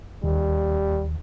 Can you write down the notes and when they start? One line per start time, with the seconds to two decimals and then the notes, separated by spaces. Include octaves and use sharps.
0.24 D#2 G3